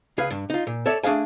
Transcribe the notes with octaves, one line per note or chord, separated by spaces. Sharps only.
C#2 G#4 B4 F5
G2
D#4 F4
A#2
A4 C#5 D5 E5
A3 D4 G#4 F5 G#5